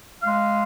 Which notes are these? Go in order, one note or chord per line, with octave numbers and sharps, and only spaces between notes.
G#3 F5